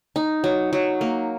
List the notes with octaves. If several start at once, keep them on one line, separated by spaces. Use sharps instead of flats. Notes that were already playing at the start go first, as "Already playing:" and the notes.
D#4
F#3
F#3
A#3